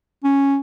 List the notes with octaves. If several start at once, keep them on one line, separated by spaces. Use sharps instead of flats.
C#4